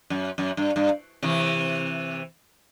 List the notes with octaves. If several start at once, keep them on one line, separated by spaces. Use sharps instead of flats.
F#2
F#2
G2
G2
C3 E3